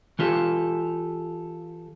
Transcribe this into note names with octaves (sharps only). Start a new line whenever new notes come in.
E3 F4 G4 A4